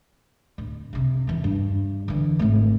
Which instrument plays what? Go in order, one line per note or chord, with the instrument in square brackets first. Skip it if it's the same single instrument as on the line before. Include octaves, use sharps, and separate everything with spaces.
[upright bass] D1
F2 C3
E2 E3
G2
D3 E3
G#1 A3